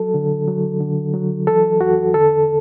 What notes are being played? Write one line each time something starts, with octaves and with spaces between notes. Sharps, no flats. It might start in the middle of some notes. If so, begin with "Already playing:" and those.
Already playing: F#3 A4
D3
F#3
D3
F#3
E3 A4
E2 F#4
D3 A4